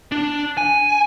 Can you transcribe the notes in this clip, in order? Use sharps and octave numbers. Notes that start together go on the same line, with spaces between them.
D4
G#5